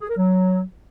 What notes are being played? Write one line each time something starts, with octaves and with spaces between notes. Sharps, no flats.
G#4
A#4
F#3